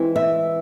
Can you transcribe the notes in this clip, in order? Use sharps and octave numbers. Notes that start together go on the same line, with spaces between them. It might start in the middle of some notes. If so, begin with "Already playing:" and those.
Already playing: E3 G#3 C4
E5